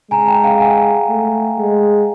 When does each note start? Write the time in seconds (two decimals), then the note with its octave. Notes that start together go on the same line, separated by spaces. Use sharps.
0.11 G#3 G#5 A#5
0.27 G5 A5
0.44 F5 G5
0.60 F#5 G#5
1.09 A3
1.58 G#3